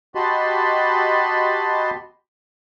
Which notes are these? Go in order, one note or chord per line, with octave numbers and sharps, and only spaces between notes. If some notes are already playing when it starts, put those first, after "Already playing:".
F#4 G4 D#5 A5 B5 C6